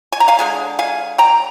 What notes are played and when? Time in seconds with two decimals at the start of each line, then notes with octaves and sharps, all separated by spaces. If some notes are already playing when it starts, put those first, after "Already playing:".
0.12 G#5
0.20 A#5
0.28 F5 G#5
0.39 D3 G#3 G#5
0.79 F5 G#5
1.18 G5 A#5